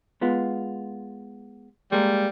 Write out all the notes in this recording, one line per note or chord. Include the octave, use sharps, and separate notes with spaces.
G#3 B3 F4
G3 G#3 A#3